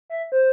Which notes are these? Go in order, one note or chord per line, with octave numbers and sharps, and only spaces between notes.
E5
C5